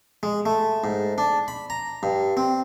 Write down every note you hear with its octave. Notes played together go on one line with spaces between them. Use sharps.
G#3
A3
G#2
D4
B5
A#5
G2
C4